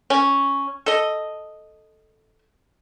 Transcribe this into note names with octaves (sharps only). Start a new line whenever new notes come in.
C#4
A4 D#5